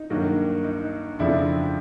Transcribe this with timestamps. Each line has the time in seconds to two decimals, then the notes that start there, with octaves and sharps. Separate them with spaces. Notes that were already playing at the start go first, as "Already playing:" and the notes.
Already playing: D#4
0.10 G2 D#3 F#3 A#3
0.64 D#4
1.19 F2 C#3 F3 A3 C4 D4 E4